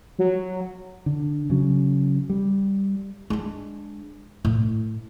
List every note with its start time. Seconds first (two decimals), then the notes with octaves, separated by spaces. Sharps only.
0.18 F#3
1.06 D3
1.50 C#3 F#3
2.30 G3
3.30 G#3 D4
4.45 A2